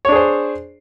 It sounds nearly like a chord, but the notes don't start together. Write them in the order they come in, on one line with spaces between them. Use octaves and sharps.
C#5 D4 G#4 C5